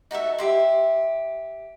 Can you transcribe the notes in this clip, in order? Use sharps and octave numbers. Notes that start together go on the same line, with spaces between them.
D#4 F#4 A4 E5
G4 E5 C6